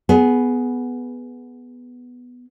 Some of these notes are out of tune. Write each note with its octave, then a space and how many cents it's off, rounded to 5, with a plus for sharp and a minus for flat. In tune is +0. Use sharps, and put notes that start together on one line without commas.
B3 +0 G#4 +15